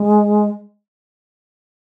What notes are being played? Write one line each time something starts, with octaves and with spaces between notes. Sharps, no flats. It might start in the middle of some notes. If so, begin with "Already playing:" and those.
Already playing: G#3